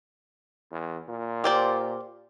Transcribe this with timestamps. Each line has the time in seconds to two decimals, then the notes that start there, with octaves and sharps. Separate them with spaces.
0.72 E2
1.09 A#2
1.44 G4 C5 D5